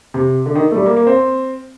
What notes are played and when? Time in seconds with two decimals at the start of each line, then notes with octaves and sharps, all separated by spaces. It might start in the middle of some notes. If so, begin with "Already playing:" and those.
0.14 C3
0.46 D3
0.55 D#3
0.71 A3
0.75 G3
0.86 A#3
0.96 A#3
1.07 C4